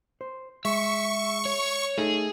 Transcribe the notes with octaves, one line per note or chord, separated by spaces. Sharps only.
C5
G#3 E5 C#6
C#5
A3 D#4 G#4 A4